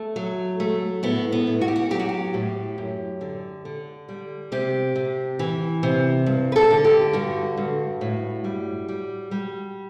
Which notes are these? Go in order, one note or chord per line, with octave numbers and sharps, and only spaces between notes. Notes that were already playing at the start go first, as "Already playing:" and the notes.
Already playing: A3
F#3
A3
A2 B3
B3
A2
F#4
G4
F#4
F#3 G4
F#4
G4
A2
F#2
D3
D3
G3
C3 G4
C3
E3
C3
G2
B4
A4
D3
G4
G2 F#4
G2
A2
G3
G3
G3